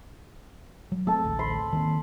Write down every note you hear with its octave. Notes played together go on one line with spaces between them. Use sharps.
F#3
A3 C4 A4 A5
A1 D2
B5 C6
D#3 A#3 C4